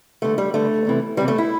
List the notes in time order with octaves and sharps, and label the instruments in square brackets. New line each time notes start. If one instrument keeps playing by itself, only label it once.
[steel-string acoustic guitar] G2 D3 A3
G3
G2 D3 A3
E2 C3 E3
E2 C3 E3 G3
A3
E4